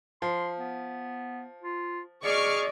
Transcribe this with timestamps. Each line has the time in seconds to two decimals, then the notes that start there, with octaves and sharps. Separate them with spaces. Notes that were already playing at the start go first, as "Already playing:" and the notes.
0.22 F3 C6
0.58 B3
1.63 F4
2.23 G#4 D5 D#5 C#6 D6 F6